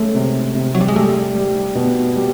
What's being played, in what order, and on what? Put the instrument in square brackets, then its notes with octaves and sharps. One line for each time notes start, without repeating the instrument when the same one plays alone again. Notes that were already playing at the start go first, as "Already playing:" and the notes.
Already playing: [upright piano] G#3 C#4 [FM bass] A3
[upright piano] C3
C3
[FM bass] F#3
G3
G#3
[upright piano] G3 [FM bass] A3
[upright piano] G3
B2
G3